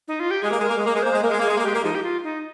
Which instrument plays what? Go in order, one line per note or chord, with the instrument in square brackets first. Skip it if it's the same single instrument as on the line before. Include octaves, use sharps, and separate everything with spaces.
[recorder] D#4
F4
G4
[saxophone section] G#3 [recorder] G#4
[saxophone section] A#3
[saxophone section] G#3 [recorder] A#4
[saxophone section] A#3
G#3
A#3
[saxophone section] G#3 [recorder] A#4
[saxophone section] A#3 [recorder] C5
[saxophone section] G#3
[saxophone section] A#3 [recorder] A#4
[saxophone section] G#3
[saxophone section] A#3 [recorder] G#4
[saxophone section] G#3
A#3
[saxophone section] G#3 [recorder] G4
[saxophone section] A#3
[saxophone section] F3 G#3 [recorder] D#4
[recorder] G4
F4
D#4